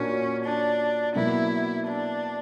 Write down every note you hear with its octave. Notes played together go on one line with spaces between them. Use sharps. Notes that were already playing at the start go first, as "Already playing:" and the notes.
Already playing: A#2 A#3 C#4 D4 F#4
D4
B2 F#3 A#3 E4
D4